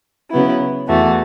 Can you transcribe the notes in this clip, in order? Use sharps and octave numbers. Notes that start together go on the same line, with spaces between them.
C#3 F#3 B3 E4
E2 E3 A3 F#4